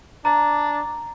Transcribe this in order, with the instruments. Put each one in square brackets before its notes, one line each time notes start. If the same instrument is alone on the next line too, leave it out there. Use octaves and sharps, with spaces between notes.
[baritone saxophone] D4 [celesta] A#5